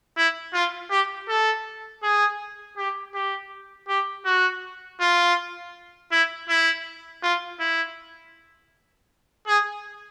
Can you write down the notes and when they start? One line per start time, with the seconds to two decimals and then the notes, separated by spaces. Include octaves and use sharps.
0.17 E4
0.53 F4
0.91 G4
1.28 A4
2.03 G#4
2.77 G4
3.14 G4
3.88 G4
4.25 F#4
5.00 F4
6.12 E4
6.49 E4
7.23 F4
7.60 E4
9.47 G#4